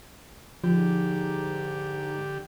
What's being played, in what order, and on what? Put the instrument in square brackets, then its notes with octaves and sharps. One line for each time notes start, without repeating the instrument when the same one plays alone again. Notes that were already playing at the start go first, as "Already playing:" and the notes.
[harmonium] G#2 [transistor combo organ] D3 G4 [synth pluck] F3